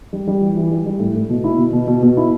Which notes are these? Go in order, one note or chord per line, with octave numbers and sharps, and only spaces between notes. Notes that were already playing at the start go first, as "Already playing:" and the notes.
G3
G3
E3
E3
G3
G3
A2
A2
B2
E4
B2
B2
B2
B2
E4